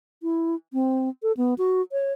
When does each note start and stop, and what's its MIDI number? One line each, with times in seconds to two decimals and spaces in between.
0.23 0.55 64
0.73 1.09 60
1.23 1.32 69
1.37 1.54 59
1.58 1.82 66
1.92 2.13 73